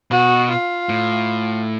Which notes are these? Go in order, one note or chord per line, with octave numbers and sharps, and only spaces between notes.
B2 F#4
F4
A2